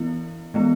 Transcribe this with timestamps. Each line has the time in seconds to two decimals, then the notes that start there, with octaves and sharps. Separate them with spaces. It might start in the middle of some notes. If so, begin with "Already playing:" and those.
Already playing: E3 B3 E4
0.54 E3 G#3 B3